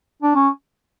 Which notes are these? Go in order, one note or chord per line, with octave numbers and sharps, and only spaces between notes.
D4
C#4